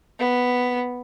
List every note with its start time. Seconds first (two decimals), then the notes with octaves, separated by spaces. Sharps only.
0.19 B3